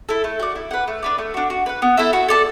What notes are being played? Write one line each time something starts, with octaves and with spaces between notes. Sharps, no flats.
E4 A4
A3
F#4 D5
E4
B4 F#5
A3
D4 B4 D5
A3
D4 F#4
F#4
B4 F#5
B3
E4 A4 E5
F#4
A4 D5 A5